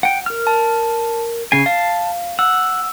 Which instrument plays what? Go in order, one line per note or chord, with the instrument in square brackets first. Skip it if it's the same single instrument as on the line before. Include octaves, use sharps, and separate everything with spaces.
[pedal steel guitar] F#5 G5
A#4 F6
[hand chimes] A5
[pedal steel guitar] C#3 G#5 [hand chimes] C7
[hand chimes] F5 [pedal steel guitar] A5
[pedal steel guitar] F#5 [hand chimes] E6